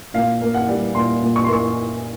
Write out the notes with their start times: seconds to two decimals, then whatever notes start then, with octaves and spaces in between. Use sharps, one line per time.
0.14 A#2 F5
0.41 A#3
0.54 F#5
0.68 G3
0.95 A#2 C6
1.22 A#2
1.36 C#6
1.44 C6
1.49 A#3 C#6